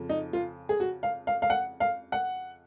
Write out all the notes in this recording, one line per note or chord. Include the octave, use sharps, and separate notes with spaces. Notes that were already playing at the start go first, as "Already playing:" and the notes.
Already playing: F2 C#3 F3
D#4
F4
G#4
F#4
F5
F5
F5
F#5
F5
F#5